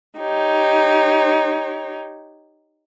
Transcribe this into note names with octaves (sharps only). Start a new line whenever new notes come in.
D#4 G4 C#5